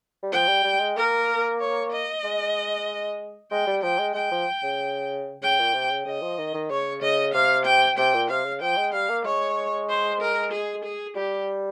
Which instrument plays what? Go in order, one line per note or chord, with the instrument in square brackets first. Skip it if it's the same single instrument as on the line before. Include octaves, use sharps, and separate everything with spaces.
[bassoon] G3
[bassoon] F3 [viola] G5
[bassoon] G3
G3
G#3
[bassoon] A#3 [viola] A#4
[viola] C#5
D#5
[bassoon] G#3
[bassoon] G#3 [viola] G5
[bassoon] G3
[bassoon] F3 [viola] G5
[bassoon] G#3
[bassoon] G#3 [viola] G5
[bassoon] F3
C#3
[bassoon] C#3 [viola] G5
[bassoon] A#2
C3
C#3
[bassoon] C#3 [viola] D#5
[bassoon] F3
D#3
D#3
[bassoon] C#3 [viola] C#5
[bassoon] C#3 [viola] D#5
[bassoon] C3 [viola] F5
[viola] G5
[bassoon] C3 [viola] G5
[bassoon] A#2
[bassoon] C3 [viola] F5
[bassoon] C#3
[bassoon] F3 [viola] G5
[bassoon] G#3
[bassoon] G3 [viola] F5
[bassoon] A#3
[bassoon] G#3 [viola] C#5
[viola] C5
A#4
G#4
G#4
[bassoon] G3 [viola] G4